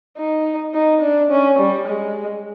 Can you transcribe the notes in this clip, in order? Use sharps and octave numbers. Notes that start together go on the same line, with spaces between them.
D#4
D#4
D4
C#4
G3
G#3